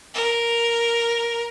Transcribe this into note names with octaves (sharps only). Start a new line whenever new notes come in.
A#4